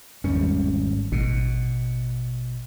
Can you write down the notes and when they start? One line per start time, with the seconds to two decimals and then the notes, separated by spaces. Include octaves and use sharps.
0.24 G#1 E2 G3 C#4
1.12 A1 B2